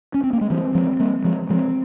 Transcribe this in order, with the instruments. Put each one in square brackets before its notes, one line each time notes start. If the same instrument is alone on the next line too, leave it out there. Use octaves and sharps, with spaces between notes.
[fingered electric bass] C#4
C4
A#3
G#3
[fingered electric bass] E3 G3 [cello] C4
[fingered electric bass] F3 G#3
G3 A#3
F3 G#3
[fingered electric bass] F3 G#3 [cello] C4